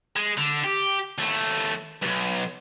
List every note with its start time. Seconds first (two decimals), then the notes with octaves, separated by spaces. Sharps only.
0.16 G#3
0.38 D3
0.64 G4
1.18 D#2 A3
2.02 B1 G2